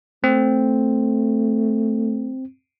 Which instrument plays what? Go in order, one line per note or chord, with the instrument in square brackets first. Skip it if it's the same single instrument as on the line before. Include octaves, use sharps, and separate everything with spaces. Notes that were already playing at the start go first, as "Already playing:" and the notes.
[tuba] A3 [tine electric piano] C4